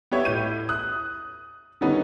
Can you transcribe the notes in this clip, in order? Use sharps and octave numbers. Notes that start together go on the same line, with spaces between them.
B3 G4 C#5 E5
A2 G6 D#7
D#6 F#6
D3 D#3 G3 B3 C#4 D#4